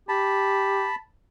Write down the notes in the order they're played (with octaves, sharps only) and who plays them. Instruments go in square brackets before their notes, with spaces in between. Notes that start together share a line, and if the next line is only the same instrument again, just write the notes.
[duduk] G4 [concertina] A5 B5